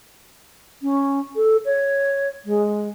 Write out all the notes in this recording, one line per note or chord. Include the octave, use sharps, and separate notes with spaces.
C#4
A4
C#5
G#3